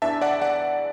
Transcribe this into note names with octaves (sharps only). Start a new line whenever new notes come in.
E2 E3 D4 E5 A5
D5 F#5
D5 F#5